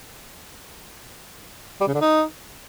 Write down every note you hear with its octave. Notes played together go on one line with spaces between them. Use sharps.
G3
C#3
D3
D#4